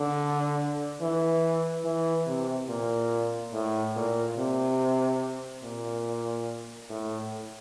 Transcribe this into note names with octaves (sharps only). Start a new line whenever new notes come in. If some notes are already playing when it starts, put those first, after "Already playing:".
Already playing: D3
E3
E3
C3
A#2
A2
A#2
C3
A#2
A2